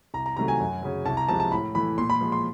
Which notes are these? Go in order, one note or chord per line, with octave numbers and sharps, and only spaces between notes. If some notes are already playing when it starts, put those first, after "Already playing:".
C2 A#5
A#5
C3 D#3 F#3 A3 A#5
G#5
F#2
C#3 F#3
C2 A5
A#5
C3 F3 G#3 A5
A5
A2 B5
E3 A3 B5
A#2 C6
B5
F3 G#3
C6